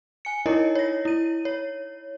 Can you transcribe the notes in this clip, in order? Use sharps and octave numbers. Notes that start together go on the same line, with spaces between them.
G#5 C#7
D#4 E4 A#4 C#5 D#5
C#5 A#6
E4 D#7
C#5